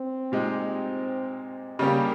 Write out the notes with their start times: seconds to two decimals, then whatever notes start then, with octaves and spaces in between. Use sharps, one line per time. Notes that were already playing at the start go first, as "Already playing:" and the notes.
Already playing: C4
0.32 A#2 G#3 D#4 G4
1.79 C#3 G3 A#3 C#4 G4